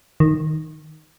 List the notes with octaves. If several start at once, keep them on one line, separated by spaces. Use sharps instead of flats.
D#3